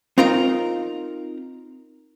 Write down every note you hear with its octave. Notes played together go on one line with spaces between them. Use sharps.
C4 D#4 F4 A#4 A#5